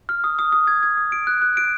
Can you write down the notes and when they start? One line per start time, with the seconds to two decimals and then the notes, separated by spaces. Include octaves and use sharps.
0.09 F6
0.24 D#6
0.39 D#6
0.52 D#6
0.67 G#6
0.83 G#6
0.97 D#6
1.12 D7
1.27 F#6
1.42 F#6
1.57 D7